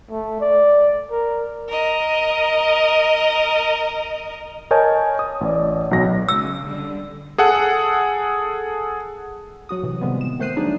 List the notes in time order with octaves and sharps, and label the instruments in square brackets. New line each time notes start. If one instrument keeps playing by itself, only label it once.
[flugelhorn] A3
D5
A#4
[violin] A#4 D#5
[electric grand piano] A#4 C#5 D#5 G#5 A5 G6
D#6
A1 D5
B1 F#3 A#6
[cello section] C#3 [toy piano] E6
[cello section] D3 G3
[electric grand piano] G#4 A4 F#5
[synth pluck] F#3 F#4 D#6
A2 C3 E3
C3 D#3 F3 G3 G#3 B3
E7
D#3 A3 C5 F#6 C7 D#7
F#3 G3 D4 D#4 G#4 D5